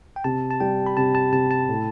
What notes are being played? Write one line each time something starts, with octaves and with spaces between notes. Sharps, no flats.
G5
C3 A5
A5
G3 G5
B5
C3 A5
A5
C3 A5
A5
A2